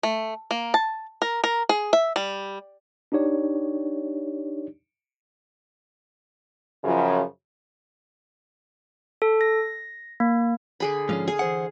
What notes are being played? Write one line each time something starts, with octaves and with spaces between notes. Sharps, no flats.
A3
A#3
A5
A#4
A#4
G#4
E5
G3
D4 D#4 G4 C#5 D5
F#2 C#3 F3
A4
A#6
A#3
D3 G#4 B5
G#2 F3 C#4 F5
G#4
E3 C5 F#5